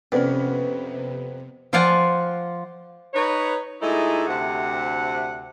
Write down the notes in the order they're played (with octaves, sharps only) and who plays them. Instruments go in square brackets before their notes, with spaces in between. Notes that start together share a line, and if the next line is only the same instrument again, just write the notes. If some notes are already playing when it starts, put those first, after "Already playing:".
[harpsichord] F2 [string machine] C3 [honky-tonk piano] B3 [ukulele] C#4 D#4 D5
[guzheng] F3 F4 D5 F5 F#5 G#5
[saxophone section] D#4 B4 C#5
A#2 G#3 A3 D#4 E4 G#4
D2 C3 F#5